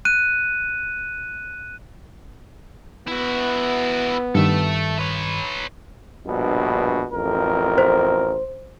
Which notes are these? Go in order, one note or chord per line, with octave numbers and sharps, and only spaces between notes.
F#6 D#7
B3 E4 F#4
G2 D#3 A4 E5
B4 C#5
A#1 G2 B2
A1 F2 A#4
C5